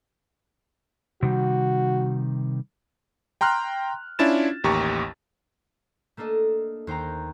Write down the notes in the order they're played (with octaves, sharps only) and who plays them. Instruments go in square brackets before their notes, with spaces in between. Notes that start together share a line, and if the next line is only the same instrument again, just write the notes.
[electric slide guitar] C3 D#3 G3 [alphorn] F#4
[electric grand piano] G5 A#5 C6 F6 F#6
C#4 D4 E4 F4 A6 E7
A1 D#2 G4 A#5 C#6
[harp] A3 A#3 D4 A4 D#5
D#2 C5 G5 A#5